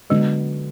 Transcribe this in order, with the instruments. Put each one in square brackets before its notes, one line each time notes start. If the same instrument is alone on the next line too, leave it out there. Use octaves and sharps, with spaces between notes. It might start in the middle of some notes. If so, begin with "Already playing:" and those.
[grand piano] D3 F#3 B3 [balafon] G#3